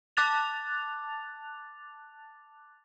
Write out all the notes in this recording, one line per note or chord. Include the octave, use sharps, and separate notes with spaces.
A5 D6 F#6 A6 F7